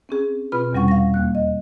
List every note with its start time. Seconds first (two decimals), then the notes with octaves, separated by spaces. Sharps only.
0.09 C4 C#4 G#4
0.52 B2 C4 F4 B4 B5 F6
0.73 E2 C3 G3 C#4 F#5 C#6
0.88 F5 A#6
1.14 D#2 A#3 F#6
1.35 D#5